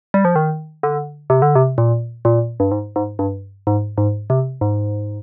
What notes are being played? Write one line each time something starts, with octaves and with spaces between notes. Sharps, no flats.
G3
F3
D#3
D3
C3
D3
C3
A#2
A#2
G2
G#2
G#2
G2
G#2
G#2
C3
G#2